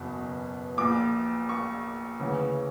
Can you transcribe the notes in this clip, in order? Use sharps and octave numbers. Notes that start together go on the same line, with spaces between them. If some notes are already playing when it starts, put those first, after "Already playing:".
Already playing: F#1 E2 B2
A#1 A#2 D6
C#6
D2 C#3 E3